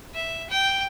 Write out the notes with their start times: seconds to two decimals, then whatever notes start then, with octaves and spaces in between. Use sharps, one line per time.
0.15 E5
0.50 G5